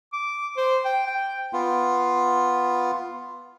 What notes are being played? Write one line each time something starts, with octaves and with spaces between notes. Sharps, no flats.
D6
C5
G5
G5
B3 F4